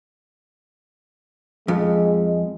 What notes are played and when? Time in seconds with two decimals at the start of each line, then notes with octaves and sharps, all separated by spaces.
1.68 F2 G#3